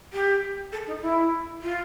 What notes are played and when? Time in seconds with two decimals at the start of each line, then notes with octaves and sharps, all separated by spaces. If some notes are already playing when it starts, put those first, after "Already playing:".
0.13 G4
0.72 A4
0.87 D#4
1.02 E4
1.61 F4